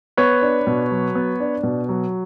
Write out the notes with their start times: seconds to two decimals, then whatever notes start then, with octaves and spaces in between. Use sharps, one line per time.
0.17 B3 B4 C#5
0.42 D4
0.67 B2
0.91 F#3
1.15 B3
1.40 D4
1.63 B2
1.89 F#3